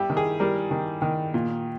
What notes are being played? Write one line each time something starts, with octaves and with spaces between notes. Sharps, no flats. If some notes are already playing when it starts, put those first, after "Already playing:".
Already playing: G3 E4 G4
D#3
G#4
G3 A#4
D#3
D#3
A#2